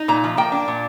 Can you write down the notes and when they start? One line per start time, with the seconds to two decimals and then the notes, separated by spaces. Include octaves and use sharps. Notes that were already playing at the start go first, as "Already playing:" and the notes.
Already playing: D#4
0.08 A#2 A#5
0.24 F3
0.37 A#3 G5
0.52 D4
0.68 A#2